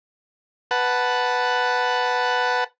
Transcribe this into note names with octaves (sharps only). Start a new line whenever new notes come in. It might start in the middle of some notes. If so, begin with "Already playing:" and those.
B4 F#5 A5